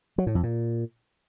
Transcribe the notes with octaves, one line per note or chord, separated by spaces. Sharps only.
F#3
A2
F2
A#2